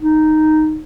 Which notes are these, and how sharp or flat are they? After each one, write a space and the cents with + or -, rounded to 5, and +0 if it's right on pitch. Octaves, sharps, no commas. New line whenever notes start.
D#4 -5